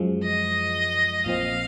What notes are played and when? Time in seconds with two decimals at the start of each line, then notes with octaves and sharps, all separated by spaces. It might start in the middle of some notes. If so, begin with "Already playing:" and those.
Already playing: F#2 F3 G#3
0.23 D#5
1.26 A#1 A#2 F3 C4 F5